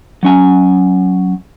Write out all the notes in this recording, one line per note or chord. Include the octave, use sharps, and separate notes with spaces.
F#3 C#4 G#5